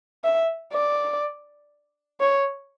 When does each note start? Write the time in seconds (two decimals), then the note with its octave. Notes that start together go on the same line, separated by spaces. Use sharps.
0.24 E5
0.73 D5
2.21 C#5